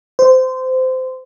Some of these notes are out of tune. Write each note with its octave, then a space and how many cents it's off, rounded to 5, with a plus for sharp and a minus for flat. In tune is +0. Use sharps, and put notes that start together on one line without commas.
C5 -20